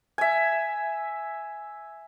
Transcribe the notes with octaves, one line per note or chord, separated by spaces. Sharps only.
E5 G#5